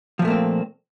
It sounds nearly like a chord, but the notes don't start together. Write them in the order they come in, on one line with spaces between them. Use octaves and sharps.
F3 A#2 A3 A#3 C4